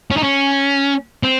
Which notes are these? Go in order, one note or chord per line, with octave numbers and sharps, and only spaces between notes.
C#4
D#4
C#4
C4